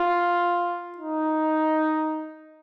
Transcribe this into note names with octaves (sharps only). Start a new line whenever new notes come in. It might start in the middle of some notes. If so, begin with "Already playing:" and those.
Already playing: F4
D#4